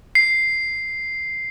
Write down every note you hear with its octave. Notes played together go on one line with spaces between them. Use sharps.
C7